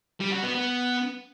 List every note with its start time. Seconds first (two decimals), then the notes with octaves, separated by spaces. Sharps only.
0.20 G3
0.32 F#4
0.43 B3
0.55 B3